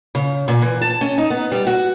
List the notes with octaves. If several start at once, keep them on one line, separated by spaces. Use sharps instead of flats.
C#3
A#2
E3
A5
C#4
D#4
B3
G3
F#4